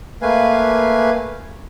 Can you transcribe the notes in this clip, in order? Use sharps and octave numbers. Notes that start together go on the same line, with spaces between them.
A3 A#3 B4 F5 G#5